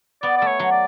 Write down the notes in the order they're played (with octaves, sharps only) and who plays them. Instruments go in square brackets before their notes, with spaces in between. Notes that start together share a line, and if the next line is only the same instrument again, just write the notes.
[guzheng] B3 [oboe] D5
[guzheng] A3 [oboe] D5
[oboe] C#5
[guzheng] F#3
[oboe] D5